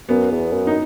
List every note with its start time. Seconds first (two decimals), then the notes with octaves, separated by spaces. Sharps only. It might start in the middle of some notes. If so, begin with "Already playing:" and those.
0.09 F#2 B3
0.32 E2
0.52 F#2
0.67 D#4